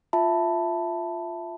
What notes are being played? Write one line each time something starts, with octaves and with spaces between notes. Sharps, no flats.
F4 E5 A5 B5